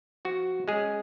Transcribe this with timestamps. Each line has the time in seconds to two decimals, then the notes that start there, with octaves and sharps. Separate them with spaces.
0.25 F3 F#4
0.68 G#3 C#4 G#4